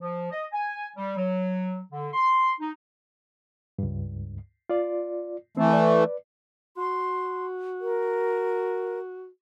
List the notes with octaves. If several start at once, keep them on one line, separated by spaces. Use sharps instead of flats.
F3
D#5
G#5
G3
F#3
D3
C6
D#4
C#2 G2
F4 D5
E3 A3 C4
B4 D5
F#4 C6
A#4